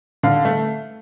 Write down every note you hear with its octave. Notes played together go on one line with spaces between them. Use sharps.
D3 F5
A3